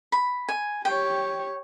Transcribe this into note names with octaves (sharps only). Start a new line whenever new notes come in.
B5
G#5
G4 C#5 G5